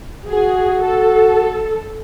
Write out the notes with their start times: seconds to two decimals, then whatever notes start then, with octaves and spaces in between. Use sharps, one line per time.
0.29 F#4 G#4
0.83 A4